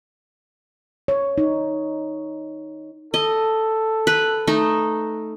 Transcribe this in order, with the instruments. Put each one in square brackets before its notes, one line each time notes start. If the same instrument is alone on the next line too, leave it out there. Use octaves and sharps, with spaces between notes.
[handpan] C#5
D#4
[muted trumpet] A4 [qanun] D#5
[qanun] B4
A3 D#4